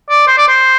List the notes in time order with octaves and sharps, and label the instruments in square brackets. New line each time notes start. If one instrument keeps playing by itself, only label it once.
[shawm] D5
C5
D5
C5